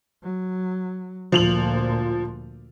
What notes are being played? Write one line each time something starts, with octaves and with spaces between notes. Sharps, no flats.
F#3
D2 A#2 F3 F7 F#7